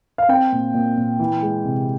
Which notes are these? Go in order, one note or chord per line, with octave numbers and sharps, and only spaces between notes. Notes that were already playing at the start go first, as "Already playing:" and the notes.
F5
C4 G5
A#2
A#2
A#2
E3
G#3
C3